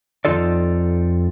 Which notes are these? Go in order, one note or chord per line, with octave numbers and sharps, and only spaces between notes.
F2 G3 D#4 F4 A4 D5